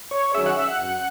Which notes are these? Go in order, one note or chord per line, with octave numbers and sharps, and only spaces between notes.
C#5
D#3 F#3 C#4 G#4 E5
F#5
E5
F#5
F#2